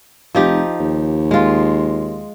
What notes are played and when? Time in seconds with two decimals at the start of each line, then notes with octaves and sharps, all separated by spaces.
0.35 F1 F3 D#4 G4
0.80 D#2
1.31 G#3 F4